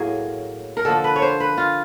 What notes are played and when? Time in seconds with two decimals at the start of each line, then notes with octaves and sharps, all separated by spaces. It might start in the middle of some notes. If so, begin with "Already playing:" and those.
Already playing: A2 F#3 A#3 G#4
0.77 A#4
0.85 D3 F3 A#3 A4
1.04 B4
1.16 C#5
1.22 C5
1.40 B4
1.57 F4